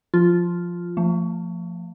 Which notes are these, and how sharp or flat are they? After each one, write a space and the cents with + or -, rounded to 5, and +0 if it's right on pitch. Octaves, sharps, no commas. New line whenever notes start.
F3 +0 F4 +0
F3 -5 A3 +35